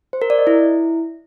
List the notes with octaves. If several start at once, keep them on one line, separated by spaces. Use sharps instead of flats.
C5
A#4
D5
D#5
E4